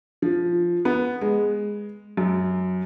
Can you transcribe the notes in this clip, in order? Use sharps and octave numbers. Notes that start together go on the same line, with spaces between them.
F3
B3
G#3
F#2